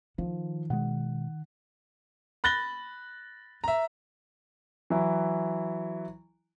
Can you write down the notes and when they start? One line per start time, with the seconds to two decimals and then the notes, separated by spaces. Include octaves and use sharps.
0.18 D#3 F3
0.70 B2 G#3 F#5
2.44 B5 F#6 A6 A#6 G7
3.64 E5 A#5
4.90 E3 F#3 E4